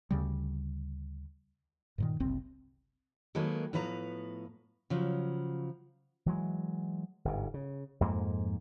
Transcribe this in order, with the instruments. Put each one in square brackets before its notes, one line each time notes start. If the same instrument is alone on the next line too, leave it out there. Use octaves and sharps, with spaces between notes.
[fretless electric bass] D2 C#3 G3
G2 A#2 D#3
F#1 C2 C4
[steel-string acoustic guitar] D#3 F#3 G#3 A#3 A4 B4
A2 F3 B3 B4 D5 A#5
C#3 F3 F#3
[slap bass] E3 F#3 G#3
G1 G#2
C#3
F2 G#2 G#3 A#3